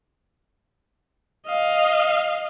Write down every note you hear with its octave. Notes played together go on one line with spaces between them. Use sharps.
D#5 F5